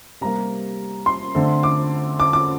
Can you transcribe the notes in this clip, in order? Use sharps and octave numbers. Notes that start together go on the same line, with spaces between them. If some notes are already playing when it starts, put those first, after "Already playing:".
C3 G3 A#3 A#5
C6
D3 A3 C4
D6
D6
D6